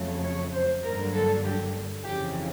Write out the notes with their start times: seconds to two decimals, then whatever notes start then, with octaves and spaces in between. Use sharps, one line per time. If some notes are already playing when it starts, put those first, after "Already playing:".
Already playing: F2 C#3 F#3 A3
0.23 C#5
0.53 C5
0.83 G2 D3 F#3 A#3 A#4
1.13 A4
1.43 G4
2.03 F2 C#3 E3 G4